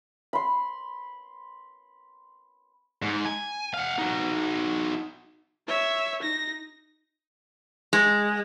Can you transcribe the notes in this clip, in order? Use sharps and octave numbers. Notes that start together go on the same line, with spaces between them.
B5 C6
G#2
G#5
F5 F#5
D#4 F#4
C#5 E5
D#4 A#6
G#3